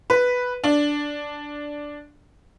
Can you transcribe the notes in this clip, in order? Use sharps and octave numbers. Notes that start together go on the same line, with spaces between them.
B4
D4